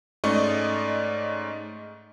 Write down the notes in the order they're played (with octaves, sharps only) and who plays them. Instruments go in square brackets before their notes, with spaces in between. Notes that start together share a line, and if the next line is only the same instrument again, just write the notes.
[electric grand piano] G#2 A3 C#4 D5 D#5 C#6